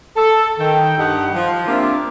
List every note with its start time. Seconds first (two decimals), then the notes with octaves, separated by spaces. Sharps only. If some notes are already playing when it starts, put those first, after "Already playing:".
0.17 A4
0.59 D#3 G5
0.97 G2 G3 D#4 G4 F#5
1.34 F3
1.67 A#3 C4 D4 F4 G4 E5